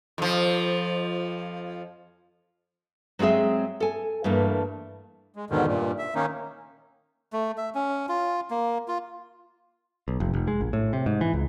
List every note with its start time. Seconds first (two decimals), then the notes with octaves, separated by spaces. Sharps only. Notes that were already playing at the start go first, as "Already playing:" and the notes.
0.18 F2 F3
3.19 F#3 G#3 C4 G#4 E5
3.80 A4 G#5
4.24 G2 E3 A3 A#3
5.36 G#3
5.50 E2 G#2 B2 D3 D#3
5.66 G2 A#2
5.99 E5
6.15 D#3 A#3 C#4 D#4
7.33 A3
7.57 E5
7.75 C#4
8.09 F4
8.51 A#3
8.88 F4
10.08 B1
10.20 F1
10.34 F1
10.48 G#3
10.61 A#1
10.73 A2
10.93 C3
11.06 G#2
11.21 E3
11.34 C#2